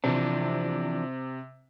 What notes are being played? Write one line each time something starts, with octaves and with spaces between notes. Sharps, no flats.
C3 E3 F3 D4